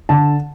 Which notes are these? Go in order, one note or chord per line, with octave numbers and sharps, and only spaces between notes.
D3 A5